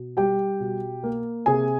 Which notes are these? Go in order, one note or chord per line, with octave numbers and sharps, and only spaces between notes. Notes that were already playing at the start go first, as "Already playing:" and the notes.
Already playing: B2
G3 G4 G5
B2
A#3
C3 G#4 G#5